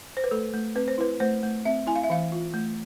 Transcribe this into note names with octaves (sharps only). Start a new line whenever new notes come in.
C5
B4
A3 A4
A3
C4 B4
C5
E4 B4
A3 C5
A3
C4 E5
E4 G#5
F5
E5
E3 F5
F4
A3